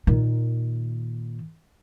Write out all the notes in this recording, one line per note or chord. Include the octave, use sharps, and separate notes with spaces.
A#2 D#3